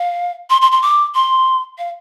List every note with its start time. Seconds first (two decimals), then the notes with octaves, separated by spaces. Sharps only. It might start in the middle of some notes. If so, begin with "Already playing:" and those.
Already playing: F5
0.50 C6
0.61 C6
0.72 C6
0.82 D6
1.15 C6
1.78 F5